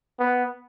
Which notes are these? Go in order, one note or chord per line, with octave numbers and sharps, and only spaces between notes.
B3